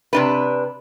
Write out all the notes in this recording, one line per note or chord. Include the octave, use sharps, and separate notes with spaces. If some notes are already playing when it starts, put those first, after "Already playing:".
C3 D4 B4